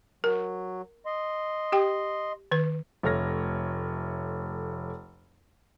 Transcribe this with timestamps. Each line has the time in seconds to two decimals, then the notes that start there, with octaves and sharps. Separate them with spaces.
0.24 F#3 A#4
1.06 D#5 C6
1.72 G4 G5
2.51 D#3 B4
3.03 F1 A3 C#5 F6 A#6